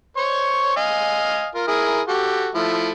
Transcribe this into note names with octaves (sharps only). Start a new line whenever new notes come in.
C5 C#5 C#6
D#5 F5 G#5
F4 A#4
E4 G#4 A#4
F#4 G4 A4
F3 A3 E4